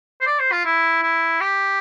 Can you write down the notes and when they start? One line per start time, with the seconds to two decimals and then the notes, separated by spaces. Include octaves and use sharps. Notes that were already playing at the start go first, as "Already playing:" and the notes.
0.21 C5
0.27 D5
0.39 C5
0.52 F4
0.65 E4
1.02 E4
1.41 G4